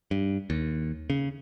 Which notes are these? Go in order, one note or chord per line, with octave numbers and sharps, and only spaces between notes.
G2
D#2
C#3